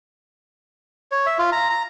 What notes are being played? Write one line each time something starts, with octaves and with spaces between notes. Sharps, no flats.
C#5
E5
F4
A#5
A#5